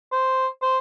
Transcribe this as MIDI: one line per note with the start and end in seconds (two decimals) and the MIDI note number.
0.12 0.47 72
0.62 0.78 72